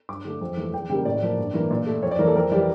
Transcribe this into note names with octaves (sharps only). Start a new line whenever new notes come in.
G2 D6
D3 A3
F2
E3 A3
E2 G5
C#3 G3 A#3 G5
A2 D5
F3 A#3
G2
E3 A#3
A#2
A3
F2 C#5
D5
E3 A#3 A#4
A4
F2 A#4
E3 G3 D5